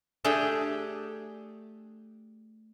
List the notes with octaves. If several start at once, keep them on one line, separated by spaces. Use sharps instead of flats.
A3 D4 G4 G#4 G5